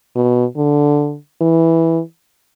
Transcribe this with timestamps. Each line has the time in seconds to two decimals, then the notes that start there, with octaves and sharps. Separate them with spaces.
0.16 B2
0.57 D3
1.42 E3